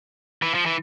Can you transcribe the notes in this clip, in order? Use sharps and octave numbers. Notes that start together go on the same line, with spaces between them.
E3
F3
E3